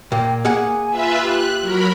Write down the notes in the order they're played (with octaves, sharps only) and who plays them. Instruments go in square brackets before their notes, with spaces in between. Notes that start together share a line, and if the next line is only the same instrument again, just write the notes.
[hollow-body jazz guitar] A#2 A#3 [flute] G5
[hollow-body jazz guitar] A#3 G#4 F#5 [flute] G#5
[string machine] F4 B4 E5
[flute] G4 [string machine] F#6
[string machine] F#3 A#4 B5